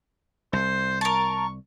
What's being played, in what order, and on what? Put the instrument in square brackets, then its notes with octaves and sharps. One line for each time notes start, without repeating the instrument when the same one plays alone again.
[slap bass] C2 [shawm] C5
[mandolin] A#4 A5 [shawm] C#6